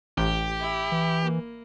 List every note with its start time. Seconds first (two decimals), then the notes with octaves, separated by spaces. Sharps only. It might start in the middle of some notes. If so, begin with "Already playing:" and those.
0.18 A1 G4
0.60 E4
0.92 E3
1.24 A#3